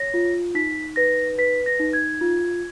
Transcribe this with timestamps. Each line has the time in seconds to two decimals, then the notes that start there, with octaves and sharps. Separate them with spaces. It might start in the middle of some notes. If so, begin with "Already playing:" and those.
Already playing: C#5 A#6
0.14 F4
0.55 D#4 B6
0.96 B4 A#6
1.38 B4 B6
1.66 A#6
1.80 D#4
1.93 G#6
2.21 F4